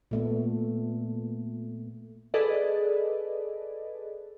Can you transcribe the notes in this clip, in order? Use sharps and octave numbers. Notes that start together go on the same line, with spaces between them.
A#2 A3 B3
G#4 A4 B4 D5 D#5